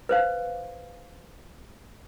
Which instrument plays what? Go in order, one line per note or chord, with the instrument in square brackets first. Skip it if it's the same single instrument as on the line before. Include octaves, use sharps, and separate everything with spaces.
[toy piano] B4 C5 F5